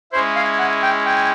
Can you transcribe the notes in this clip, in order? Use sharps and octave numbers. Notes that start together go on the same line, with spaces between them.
G#3 C#4 E4 C5
F5
F#5
G5
G5